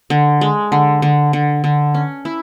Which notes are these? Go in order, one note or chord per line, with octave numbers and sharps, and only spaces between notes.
D3
G#3
D3
D3
D3
D3
C#4
E4